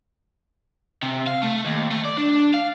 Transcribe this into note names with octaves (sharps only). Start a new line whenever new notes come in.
C3
F5
A3
D#2
A3
D5
D4
F5